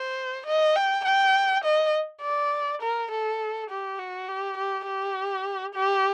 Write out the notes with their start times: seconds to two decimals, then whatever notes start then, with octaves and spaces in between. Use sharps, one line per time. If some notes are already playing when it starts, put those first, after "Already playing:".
Already playing: C5
0.46 D#5
0.76 G5
1.04 G5
1.64 D#5
2.22 D5
2.82 A#4
3.11 A4
3.70 G4
3.98 F#4
4.28 G4
4.57 G4
4.86 G4
5.74 G4